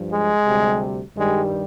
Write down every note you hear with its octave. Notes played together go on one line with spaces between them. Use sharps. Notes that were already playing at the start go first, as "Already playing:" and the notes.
Already playing: G2 F3
G#3
D2 C3 G3
G2 D#3 G3 G#3